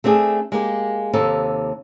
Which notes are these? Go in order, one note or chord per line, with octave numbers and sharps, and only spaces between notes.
A3 C4 D4 G4 G#4
G#3 A#3 G4
D#2 C3 D#4 A4